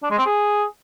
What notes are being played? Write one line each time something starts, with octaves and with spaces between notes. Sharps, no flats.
D4
G#3
C4
G#4